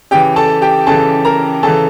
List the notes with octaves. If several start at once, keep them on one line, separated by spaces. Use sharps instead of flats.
C#3 E3 G4 G5
A4 A5
G4 G5
C#3 E3 A4 A5
A#4 A#5
C#3 E3 A4 A5